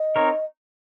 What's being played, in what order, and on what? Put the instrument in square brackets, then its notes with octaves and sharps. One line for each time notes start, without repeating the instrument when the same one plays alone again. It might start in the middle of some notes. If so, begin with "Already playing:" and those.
Already playing: [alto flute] D#5
[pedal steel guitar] C4 D#4 A#4 C#5